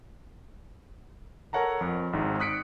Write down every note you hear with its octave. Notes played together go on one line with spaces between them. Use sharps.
A4 A#4 C#5 F#5 A5 A#5
F2
G#1 G#2 D#4
D#6 F#6 B6 C#7 D7